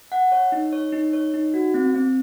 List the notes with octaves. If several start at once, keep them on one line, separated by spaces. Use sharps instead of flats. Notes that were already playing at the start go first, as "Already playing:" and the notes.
F#5
C#5
D#4
C#5
D#4
C#5
D#4
F#4
C4
C4